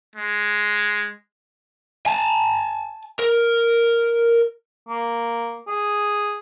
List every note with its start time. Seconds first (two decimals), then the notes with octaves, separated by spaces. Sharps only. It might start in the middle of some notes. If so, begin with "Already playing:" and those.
0.16 G#3
2.06 G#5 A5
3.19 A#4
4.89 A#3
5.67 G#4